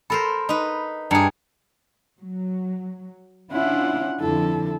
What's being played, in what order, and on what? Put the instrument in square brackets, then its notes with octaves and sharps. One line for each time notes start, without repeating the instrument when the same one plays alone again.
[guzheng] A4 A#4 C5 [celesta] B5
[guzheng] D#4 B4
[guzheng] G2 G#4 [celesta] A5 A#5 C#7
[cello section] F#3
[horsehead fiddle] C#4 F#5 [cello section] D4 E4 F4
[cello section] F2 D3 [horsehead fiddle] E4 A4